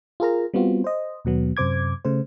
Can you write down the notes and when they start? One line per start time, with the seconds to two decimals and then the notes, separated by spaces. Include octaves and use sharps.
0.20 F4 G#4 A#4 A#5
0.54 G3 B3 C4 F4 F#4
0.84 C5 D#5
1.25 D#2 B2 F#3 B3
1.57 F#2 C3 C5 D6 G#6
2.05 C#3 A3 C5